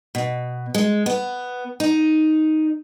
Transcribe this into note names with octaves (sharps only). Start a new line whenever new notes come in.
B2
G#3
B3
D#4